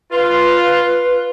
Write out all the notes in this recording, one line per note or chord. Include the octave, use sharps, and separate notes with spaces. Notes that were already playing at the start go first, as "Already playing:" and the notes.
F4 B4